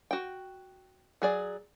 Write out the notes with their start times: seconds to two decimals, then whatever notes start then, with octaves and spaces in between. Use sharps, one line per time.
0.11 F#4 G5
1.22 F#3 G#4 D5